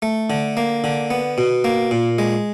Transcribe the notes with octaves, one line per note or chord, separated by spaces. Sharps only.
A3
D3
A#3
D3
B3
B2
A#3
A#2
G#3